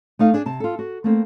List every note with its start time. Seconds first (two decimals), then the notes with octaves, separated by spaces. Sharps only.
0.19 A3 D#4 F5
0.34 D4 G#4
0.46 C3 A5
0.60 F4 A4
0.79 F#4
1.04 A3 A#3 C4